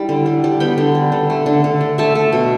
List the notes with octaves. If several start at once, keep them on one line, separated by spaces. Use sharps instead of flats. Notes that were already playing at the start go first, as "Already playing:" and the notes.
Already playing: G3 E4
D3
G3
G3
B3 G5 B5
D3
G3
D3
A3
D3
D3
D3
A3 E5 A5
A3
B2